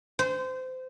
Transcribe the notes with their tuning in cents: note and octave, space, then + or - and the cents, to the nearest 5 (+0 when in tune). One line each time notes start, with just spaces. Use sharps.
C5 -25